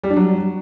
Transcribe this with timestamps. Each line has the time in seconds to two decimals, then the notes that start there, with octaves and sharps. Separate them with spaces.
0.04 G3
0.10 D4
0.17 F#3